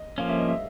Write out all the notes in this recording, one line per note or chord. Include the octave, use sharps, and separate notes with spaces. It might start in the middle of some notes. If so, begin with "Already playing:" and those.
Already playing: D#5
F3 A#3 C#4 F5
E5
D#5
E5